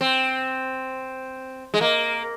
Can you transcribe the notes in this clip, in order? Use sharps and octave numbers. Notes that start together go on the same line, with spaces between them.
C4
G#3
A#3